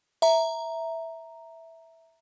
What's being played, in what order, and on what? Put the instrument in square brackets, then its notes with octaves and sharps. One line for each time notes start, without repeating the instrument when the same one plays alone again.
[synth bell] E5 A#5